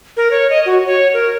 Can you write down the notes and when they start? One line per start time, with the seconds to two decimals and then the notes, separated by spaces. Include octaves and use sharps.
0.17 A#4
0.31 C#5
0.50 D#5
0.66 F#4
0.86 C#5
1.14 A#4